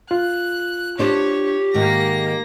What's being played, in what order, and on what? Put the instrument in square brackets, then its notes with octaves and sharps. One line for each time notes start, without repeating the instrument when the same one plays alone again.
[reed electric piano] F4 [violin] F#6
[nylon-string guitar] D4 C5 [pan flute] G4 [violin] C#5
[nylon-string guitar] G#2 D#3 [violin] A#3 A#6